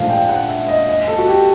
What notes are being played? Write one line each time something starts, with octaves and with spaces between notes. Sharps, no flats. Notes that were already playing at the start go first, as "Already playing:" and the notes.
Already playing: A#1 G#2 F3 A3 F5
G5
F#5
E5
D#5
D#5
A4
F#4
G4